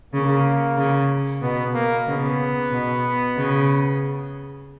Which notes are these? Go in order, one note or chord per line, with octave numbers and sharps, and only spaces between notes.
C#3 A#3
C#3
B2 B3
A#3
C#3 B3
B2
C#3